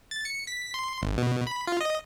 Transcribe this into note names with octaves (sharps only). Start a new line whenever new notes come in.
A6
C#7
B6
C6
G#1
B2
B5
F4
D#5